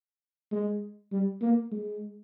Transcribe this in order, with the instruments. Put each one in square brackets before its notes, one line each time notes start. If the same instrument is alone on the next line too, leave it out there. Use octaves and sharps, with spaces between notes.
[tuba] G#3
G3
A#3
G#3